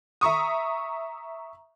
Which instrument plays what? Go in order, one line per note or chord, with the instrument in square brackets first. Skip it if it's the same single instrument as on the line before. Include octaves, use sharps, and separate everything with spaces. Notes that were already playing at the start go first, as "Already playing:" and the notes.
[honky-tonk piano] E5 A#5 C#6 D#6